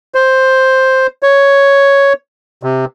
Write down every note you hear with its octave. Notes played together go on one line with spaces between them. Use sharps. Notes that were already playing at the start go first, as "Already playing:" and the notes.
C5
C#5
C3